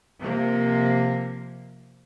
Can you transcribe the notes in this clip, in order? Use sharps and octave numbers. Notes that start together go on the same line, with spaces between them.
C3 F3 A#3